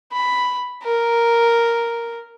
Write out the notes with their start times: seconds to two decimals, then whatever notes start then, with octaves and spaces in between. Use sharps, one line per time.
0.12 B5
0.83 A#4